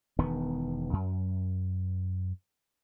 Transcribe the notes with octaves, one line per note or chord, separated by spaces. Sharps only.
E1 D#3 B3
F#2